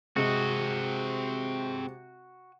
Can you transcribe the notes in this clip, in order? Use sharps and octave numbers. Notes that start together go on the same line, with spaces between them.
C3 G#3 C4 F#4 D#5